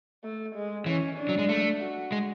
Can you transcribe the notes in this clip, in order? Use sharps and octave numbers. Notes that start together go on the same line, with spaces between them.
A3
G#3
E3 C#4
D4
F#3
G#3
A3
F#4
G#3